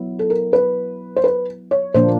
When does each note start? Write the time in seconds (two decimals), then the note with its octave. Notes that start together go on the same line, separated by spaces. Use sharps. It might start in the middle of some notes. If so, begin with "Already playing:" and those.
Already playing: F#3 B3 E4
0.19 A4
0.30 A#4
0.53 B4
1.16 C5
1.24 B4
1.71 C#5
1.94 A#2 F3 A#3 D4 C5